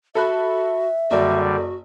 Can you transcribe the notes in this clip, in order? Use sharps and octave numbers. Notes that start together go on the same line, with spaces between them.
F#4 A4 E5 B5 F#6
F#1 D3 G3 F#4 D5